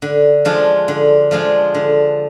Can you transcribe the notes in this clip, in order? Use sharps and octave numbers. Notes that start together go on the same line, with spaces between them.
D3
F3 G#3 D4 F4
D3
F3 G#3 D4 F4
D3